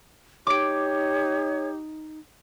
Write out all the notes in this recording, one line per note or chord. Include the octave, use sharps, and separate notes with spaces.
D#4 G4 C#5 D6 D7